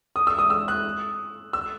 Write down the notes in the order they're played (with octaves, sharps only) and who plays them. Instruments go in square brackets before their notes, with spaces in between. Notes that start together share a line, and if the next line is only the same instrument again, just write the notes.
[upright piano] D#6
E6
D#6
E6
F#6
E6